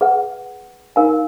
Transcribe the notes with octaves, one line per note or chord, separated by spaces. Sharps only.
G#4 B4 F#5
D#4 A#4 F5 G#5